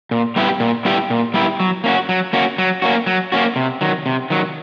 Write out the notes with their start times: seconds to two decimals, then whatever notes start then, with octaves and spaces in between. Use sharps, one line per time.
0.11 A#2
0.36 G3 B3 E4 G4
0.60 A#2
0.85 G3 B3 E4 G4
1.10 A#2
1.34 G3 B3 E4 G4
1.60 F#3
1.84 A#3 C#4 F#4
2.09 F#3
2.33 A#3 C#4 F#4
2.58 F#3
2.82 A#3 C#4 F#4
3.07 F#3
3.32 A#3 C#4 F#4
3.56 C3
3.81 D#3 F#3
4.06 C3
4.30 D#3 F#3